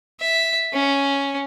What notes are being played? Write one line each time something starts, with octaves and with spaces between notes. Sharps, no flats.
E5
C#4